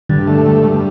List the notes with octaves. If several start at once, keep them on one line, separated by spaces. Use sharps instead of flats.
G2 D3
A3
G2
G2